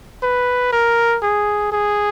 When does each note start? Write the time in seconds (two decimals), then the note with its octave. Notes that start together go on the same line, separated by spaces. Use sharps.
0.23 B4
0.72 A#4
1.23 G#4
1.72 G#4